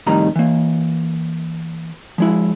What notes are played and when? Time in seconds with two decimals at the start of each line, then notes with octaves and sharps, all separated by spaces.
0.06 F2 A2 D#3 G3 D#4 A#5
0.36 E3 A#3
2.18 F3 G#3 E4